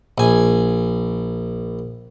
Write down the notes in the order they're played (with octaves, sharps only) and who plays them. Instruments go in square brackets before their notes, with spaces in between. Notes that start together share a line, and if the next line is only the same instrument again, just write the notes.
[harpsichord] A#1 G#5